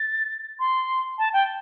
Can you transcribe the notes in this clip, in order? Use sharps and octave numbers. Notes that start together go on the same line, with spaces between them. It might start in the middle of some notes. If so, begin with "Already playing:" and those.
Already playing: A6
C6
A5
G5